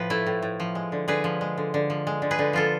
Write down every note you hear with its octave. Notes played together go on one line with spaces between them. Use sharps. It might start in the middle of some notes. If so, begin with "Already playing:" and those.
Already playing: A2 F3 B4
A3 E4
A2
A2
F3
G#3
D3
D3 G#4 B4
F3
G#3
D3
D3
F3
G#3
D3
G#4 B4
D3
F3 F4 A4